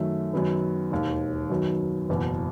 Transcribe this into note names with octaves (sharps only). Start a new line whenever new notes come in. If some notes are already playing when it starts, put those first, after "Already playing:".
Already playing: F#2 D#3 F#3 A3
F#2 D#3 F#3 B3
E1 D#2 D#3
F#2 D#3 F#3 B3
F#1 E2 B2